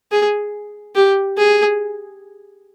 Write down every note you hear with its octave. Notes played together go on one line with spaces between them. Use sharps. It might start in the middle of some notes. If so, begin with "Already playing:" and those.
G#4
G4
G#4